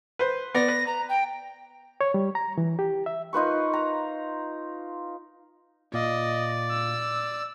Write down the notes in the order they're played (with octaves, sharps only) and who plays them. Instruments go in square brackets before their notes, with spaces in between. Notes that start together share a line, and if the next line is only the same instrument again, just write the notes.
[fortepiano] B4 C5
[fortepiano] B3 D5 [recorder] A#6
[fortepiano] B4
[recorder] A#5
G5
[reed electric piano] C#5
G3
A#5
E3
G4
E5
[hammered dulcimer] D#4 F4 B4 C#6
A#5
[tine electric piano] A#2 F5 [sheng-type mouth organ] D5 [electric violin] D#5
[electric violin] E6